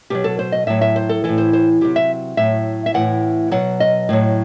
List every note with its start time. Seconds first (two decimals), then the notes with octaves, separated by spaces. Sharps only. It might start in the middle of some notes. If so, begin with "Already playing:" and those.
0.10 B2 F#3 G4
0.24 A4
0.39 C5
0.52 D#5
0.67 A2 F#3 E5
0.81 E5
0.96 C5
1.09 A4
1.24 A2 E3 A4
1.38 C5
1.53 C5
1.81 C3 F#3 G4
1.96 E5
2.37 A2 F#3 E5
2.86 E5
2.94 A2 E3 F#5
3.52 B2 F#3 F#5
3.80 D#5
4.09 A2 F#3